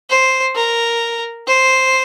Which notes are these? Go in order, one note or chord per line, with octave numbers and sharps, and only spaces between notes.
C5
A#4
C5